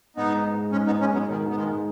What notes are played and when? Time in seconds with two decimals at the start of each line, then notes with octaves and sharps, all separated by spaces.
0.16 G#2 B3 D#4
0.36 D#4
0.54 G#2
0.72 G#2 G#3 C#4
0.86 B3 D#4
0.91 G#2
1.00 G#3 C#4
1.09 G#2 F#3 B3
1.27 B2 D#3 D#4
1.46 G#2 B3
1.56 D#3 G#3
1.65 G#2